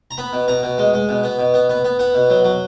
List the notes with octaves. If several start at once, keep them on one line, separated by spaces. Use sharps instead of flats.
A#5
B3 B5
B2
B2 A#5
B2
G#3
G#3
B2
B3
B2
B3
B3
B3
B3 F#5
B2
F#3
F#3